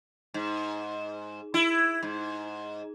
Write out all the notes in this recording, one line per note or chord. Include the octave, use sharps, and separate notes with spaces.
G#2
E4
G#2